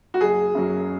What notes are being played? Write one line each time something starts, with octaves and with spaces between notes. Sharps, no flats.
F#4
F#1 G#4
F#2 F#3